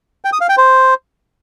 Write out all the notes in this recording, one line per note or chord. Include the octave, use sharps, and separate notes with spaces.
G5
D#6
F5
G5
C5